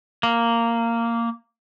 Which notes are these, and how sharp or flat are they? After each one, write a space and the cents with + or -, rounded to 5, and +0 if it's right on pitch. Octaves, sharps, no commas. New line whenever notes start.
A#3 -10